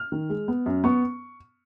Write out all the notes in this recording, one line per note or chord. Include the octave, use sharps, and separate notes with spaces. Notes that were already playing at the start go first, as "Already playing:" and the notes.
Already playing: F6
D#3
G#3
B3
F#2
B3 C#6